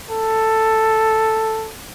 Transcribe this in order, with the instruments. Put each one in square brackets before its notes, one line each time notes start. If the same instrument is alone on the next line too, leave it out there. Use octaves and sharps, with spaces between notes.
[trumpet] A4